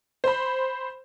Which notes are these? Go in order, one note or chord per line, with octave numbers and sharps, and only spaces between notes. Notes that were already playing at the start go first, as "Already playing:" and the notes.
C5 B5